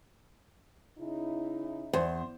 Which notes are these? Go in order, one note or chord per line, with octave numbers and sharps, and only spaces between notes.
C#3 D#4 E4
E2 C5